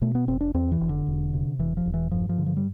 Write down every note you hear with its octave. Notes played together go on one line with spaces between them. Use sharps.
B2 A3
B3
F1 C4
D4
E2 C4
E3
F1
D3
E1
C3
E1 E3
F3
E1
E3
G2 F3
F3
D3
F3
G3